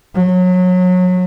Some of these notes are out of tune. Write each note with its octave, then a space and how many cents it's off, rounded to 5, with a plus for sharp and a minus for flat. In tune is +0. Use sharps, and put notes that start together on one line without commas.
F#3 -25